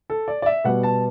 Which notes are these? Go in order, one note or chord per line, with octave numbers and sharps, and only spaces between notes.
A4
D5
D5
E5
B2 G3 B3 F#5
A5